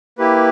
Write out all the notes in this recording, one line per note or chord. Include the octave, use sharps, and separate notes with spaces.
A#3 E4 G4 B4